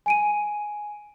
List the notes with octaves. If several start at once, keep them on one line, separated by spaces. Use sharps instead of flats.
G#5 D7 D#7